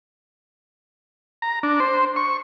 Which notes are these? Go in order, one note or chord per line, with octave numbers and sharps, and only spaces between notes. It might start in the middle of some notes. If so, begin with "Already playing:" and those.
A#5
D4
C5
C#6